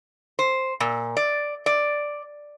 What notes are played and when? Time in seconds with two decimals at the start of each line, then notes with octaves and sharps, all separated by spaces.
0.39 C5
0.80 A#2
1.17 D5
1.66 D5